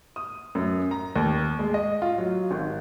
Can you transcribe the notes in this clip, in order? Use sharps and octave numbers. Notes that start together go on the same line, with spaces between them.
D#6
F#2
A#5
D#2
G#3
D#5
F4
F#3
G#1